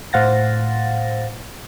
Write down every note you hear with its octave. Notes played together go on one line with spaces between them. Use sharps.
A2 C5 F5 F#5 A6 A#6